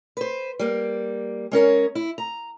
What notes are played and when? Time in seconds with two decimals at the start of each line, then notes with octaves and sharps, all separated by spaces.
0.17 B4 C5
0.59 G3 A#3
1.51 G#3 C#4 A#4 C#5
1.95 E4
2.18 A#5